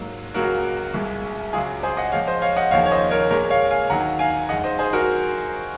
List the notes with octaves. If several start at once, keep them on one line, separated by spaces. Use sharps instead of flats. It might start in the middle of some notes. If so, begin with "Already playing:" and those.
Already playing: G#2 F#3 A#3
C#2 C#3 F#3 A#3 F#4 A#4
C2 A#2 G#3
C#2 C#3 F#3 F4 G#4
G#4 C5
D#5 F#5
A#2 F3 G#3 C#5 F5
C5 D#5
C#5 F5
D#5 F#5
D#2 C#3 F3 A#3 C#5 F5
C#5
C5 D#5
A#4 C#5
A#2 G#3 A#4 C#5
C#5 F5
F5 G#5
D#2 D#3 F#3 A#3 F#5 A#5
F5 G#5
F#2 D#3 G#3 D#5 F#5
C5 D#5
G#4 C5
F#4 A#4